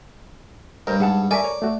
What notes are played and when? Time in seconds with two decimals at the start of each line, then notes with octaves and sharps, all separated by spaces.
0.87 G2 A#4 C5 D#5
1.00 G#2 G#4 F#5 A5
1.31 A4 A#4 D5 E5 G#5 C#6
1.44 C#5
1.62 A3 F#4